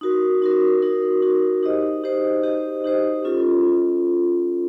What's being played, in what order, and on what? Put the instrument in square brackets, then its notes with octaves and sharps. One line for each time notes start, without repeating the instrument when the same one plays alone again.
[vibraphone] D#4 F#4 A#4
D#4 F#4 A#4
D#4 F#4 A#4
D#4 F#4 A#4
D#4 G4 C5 D#5
D#4 G4 C5 D#5
D#4 G4 C5 D#5
D#4 G4 C5 D#5
C#4 F4 A4